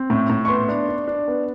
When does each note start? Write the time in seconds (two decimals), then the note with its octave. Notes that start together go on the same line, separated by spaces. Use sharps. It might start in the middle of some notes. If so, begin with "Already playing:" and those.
Already playing: C4
0.10 A2
0.30 A2
0.45 C#6
0.48 B3 C6
0.68 D4
0.89 D4
1.07 D4
1.28 B3